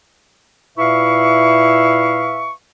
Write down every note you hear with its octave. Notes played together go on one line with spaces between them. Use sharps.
A#2 E4 B4 E5 F5 C#6